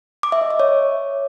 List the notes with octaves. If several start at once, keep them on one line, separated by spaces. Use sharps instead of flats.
D6
E5
D#5
E5
C#5